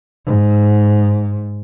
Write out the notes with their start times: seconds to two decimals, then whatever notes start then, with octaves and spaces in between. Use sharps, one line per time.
0.26 G#2